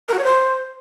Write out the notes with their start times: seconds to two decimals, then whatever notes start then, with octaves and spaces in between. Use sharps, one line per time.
0.08 A#4
0.13 F#4
0.19 C#5
0.24 C5